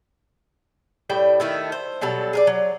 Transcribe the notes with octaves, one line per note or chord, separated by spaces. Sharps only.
A2 G3 G5
D#3 A3 E4
C5
B2 F#3 G3 A4
G#4 A#4 D5
F#3